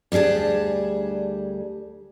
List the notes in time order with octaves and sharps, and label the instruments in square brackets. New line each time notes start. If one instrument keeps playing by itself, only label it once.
[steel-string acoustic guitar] D2 G3 D4 G#4 A5